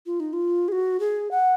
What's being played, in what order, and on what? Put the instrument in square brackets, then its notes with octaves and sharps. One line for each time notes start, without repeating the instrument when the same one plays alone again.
[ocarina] F4
D#4
F4
G#4
F#4
G#4
F#5